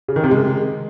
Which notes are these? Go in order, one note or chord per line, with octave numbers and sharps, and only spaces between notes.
C#3
D#3
C3
G#3